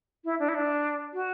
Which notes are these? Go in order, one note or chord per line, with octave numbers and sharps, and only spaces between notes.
E4
D4
E4
D4
F#4